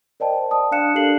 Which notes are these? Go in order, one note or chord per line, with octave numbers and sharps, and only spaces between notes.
A#4 C5 D5 D#5 G5 A5
A5 D#6
D4 D5 F5 F#6 C#7 E7
D4 G4 A4 A#4 C7 F#7